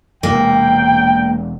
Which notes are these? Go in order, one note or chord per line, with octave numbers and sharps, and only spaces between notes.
E1 C3 G#3 A#3 G5